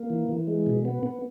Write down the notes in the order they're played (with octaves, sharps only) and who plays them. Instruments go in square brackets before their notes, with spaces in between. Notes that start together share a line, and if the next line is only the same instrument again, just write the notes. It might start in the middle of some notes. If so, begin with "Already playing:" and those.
Already playing: [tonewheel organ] A#3
E3
E3
G#3
B2
B3
B3